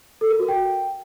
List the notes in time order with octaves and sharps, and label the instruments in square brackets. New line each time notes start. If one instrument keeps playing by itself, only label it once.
[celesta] A4
A#4
F#4
G5